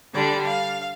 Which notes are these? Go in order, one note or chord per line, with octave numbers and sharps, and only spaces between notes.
D3 G3 D4 D5
F5